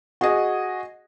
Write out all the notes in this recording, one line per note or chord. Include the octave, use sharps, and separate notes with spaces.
F#4 G#4 D#5